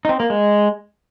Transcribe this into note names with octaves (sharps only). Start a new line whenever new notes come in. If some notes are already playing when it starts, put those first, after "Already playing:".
D#4
C4
A#3
G#3